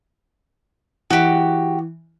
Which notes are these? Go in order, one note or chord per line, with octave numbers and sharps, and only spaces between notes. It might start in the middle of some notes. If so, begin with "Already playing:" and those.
E3 F#4 G4